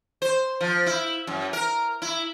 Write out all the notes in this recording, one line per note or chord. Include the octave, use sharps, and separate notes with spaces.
C5
F3
E4
F#2
A#4
E4